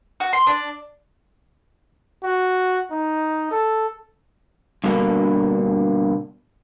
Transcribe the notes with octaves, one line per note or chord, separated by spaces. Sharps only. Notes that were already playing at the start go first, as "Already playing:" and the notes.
F#4
C6
D4
F#4
D#4
A4
G2 B2 D3 A#3